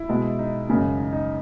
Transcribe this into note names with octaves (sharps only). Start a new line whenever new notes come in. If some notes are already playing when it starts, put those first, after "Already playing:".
Already playing: E4
B2 G#3
D#4
F#2 C#3 G#3
D#4
D#4